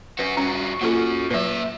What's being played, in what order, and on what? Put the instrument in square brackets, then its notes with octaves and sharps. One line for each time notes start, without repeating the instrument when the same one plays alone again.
[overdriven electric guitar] C#4 F#4 [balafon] B4
[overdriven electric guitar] G2 F#4 [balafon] C#4
[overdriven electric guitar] F#3 C#4 [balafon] A#3 F4 A4
[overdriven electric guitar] A#2 E5 [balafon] F#3 B4